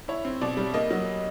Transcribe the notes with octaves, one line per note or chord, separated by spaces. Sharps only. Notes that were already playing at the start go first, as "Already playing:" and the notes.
E4 C#5
C4
B2 D5
G3
A#3 D#5
F#3